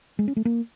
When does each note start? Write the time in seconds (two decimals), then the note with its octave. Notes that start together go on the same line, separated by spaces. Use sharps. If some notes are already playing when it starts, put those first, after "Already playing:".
0.19 G#3
0.28 C#4
0.36 A3
0.45 A#3